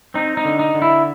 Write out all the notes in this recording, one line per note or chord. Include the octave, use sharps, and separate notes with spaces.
C4 D#4
D#4
D3
D#4
D3
E4